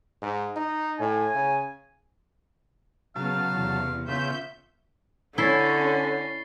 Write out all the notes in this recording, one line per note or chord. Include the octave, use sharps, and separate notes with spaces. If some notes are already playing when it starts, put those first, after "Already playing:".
G#2
D#4
A2 G#5
C#3
C#3 F#3 B3 F5 A5
E2 C3
C#3 B3 F4 E5 G6
D3 C#4 E4 A6 C7 G7